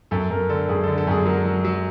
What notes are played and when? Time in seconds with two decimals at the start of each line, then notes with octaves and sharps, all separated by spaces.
0.11 F#2 A4
0.30 F#2 A#4
0.49 D3 A4
0.69 F#2 G#4
0.83 D3 A4
0.98 A4
1.07 F#2 G#4
1.26 F#3 A#4
1.45 F#3
1.65 F#3